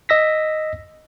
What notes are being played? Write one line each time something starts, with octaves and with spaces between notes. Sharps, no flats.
D#5 E6 A#6 B6